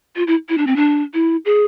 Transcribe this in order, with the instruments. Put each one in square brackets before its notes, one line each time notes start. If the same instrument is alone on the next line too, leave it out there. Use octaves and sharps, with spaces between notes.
[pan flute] F4
E4
E4
D4
C4
D4
E4
G#4